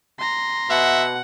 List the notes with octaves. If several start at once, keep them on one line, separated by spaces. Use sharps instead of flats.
A#5 C6
B2 E5 F#5